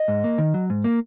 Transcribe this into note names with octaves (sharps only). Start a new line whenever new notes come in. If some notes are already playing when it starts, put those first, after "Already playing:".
Already playing: D#5
G#2
A#3
D#3
F#3
G#2
A#3